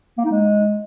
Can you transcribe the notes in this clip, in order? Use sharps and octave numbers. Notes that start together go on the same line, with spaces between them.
A#3
D#4
G#3